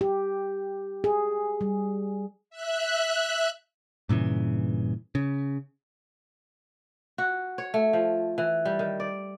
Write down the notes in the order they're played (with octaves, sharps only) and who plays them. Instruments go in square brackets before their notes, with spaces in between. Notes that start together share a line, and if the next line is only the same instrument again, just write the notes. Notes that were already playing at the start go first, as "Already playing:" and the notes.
[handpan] G4
G#4
G3
[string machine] E5 F#6
[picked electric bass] G2 A#2 C#3 E3
C#3
[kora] F#4
C#5
A3
F3
E3
G3
D#3
D5